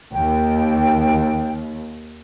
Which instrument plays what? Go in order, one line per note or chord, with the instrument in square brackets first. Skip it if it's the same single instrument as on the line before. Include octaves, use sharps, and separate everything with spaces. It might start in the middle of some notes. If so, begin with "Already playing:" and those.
[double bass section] D#2 [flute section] G5